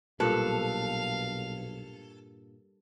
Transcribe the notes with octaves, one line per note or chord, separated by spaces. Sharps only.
B1 G2 A#2 A4 B4 F5 F7